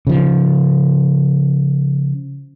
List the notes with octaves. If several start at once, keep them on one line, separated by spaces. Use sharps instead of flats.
C#3 F3